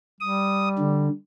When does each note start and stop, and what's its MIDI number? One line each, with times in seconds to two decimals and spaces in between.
0.20 1.17 55
0.20 0.69 87
0.79 1.09 50